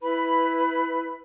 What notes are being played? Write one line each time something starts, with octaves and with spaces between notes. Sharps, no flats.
E4 B4 B5